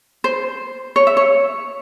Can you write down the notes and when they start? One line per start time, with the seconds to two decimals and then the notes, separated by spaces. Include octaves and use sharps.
0.24 C5
0.96 C#5
1.07 E5
1.17 C#5